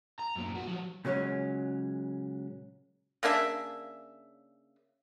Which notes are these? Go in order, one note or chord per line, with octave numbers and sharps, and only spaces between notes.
A#5
F#2 A#2
B1 F#4
F3 F#3
A#2 C#3 F#3 G#3 C#4
C#3 A#3 D4 E5